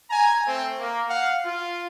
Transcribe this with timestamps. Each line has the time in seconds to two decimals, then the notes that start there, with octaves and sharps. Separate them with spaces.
0.10 G#5 A#5
0.46 A3 C4
0.80 A#3
1.09 F5 F#5
1.45 F4